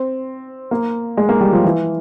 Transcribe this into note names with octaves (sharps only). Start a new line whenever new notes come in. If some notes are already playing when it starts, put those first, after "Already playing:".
Already playing: C4
A#3
G#3
A#3
G3
F3
E3